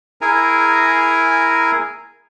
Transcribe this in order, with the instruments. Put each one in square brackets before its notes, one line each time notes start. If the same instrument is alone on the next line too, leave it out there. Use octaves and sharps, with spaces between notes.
[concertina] E4 G#4 A#4 G#5 A#5